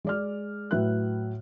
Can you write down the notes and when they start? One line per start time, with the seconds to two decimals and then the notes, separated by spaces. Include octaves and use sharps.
0.05 G#3 D5 F6
0.71 A2 F#3 B4 E5 F#6